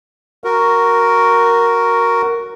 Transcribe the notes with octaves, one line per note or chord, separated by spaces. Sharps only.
F#4 A#4